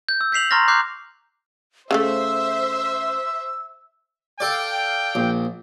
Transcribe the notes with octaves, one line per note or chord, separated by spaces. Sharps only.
G6
E6
G6 B6 C7 F7 F#7
A#5 C6 C#6 F6 A6 A#6
D6 F#6 G6 C7
C#3 F3 A3 C5 E5 E6
A4 D5 F5 G5
A#1